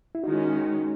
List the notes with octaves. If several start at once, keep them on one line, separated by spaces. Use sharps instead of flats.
E4
D#3 G#3 C#4 D#4 F#4